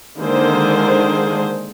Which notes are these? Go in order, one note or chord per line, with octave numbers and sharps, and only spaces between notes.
D3 D#3 G#3 A#3 G#4 C5